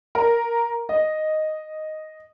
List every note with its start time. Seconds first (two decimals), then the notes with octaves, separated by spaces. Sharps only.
0.15 A#4
0.89 D#5